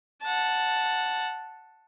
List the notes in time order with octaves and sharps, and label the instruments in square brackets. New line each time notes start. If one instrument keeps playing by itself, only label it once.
[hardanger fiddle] F#5 A5